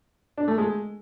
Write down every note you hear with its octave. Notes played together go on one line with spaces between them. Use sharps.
D4
A3
G#3